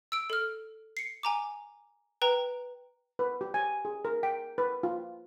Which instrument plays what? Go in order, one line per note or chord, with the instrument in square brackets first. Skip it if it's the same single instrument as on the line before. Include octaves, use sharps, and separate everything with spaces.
[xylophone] E6 D7
A4 F6
C7 C#7
G#5 A#5 D6
B4 G5 A#5
[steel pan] B4
G4
G#5
G#4
A#4
G5
B4
F4